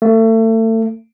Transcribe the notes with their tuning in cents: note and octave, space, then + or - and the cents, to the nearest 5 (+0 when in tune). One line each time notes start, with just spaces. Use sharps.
A3 +30